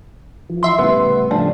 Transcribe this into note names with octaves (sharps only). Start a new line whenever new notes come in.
E3 F3
E5 C6
A2 C#3 G3 B3
F3 A3 D4